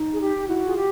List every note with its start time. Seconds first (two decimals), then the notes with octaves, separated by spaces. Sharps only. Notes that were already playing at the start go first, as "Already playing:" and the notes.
Already playing: D#4
0.14 G#4
0.21 G4
0.48 E4 F#4
0.64 F4 G#4
0.76 G4